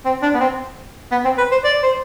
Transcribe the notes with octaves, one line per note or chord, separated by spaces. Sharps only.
C4
D4
B3
C4
B3
C4
B4
C5
D5
C5